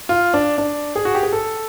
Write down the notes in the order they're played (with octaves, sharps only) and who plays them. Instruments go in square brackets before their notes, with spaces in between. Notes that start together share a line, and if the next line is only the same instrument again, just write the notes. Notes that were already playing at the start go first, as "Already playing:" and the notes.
[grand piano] F4
D4
D4
G#4
F#4
G4
G#4
A4